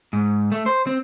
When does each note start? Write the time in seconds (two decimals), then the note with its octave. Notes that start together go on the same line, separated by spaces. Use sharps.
0.13 G#2
0.52 A3
0.66 C5
0.87 C4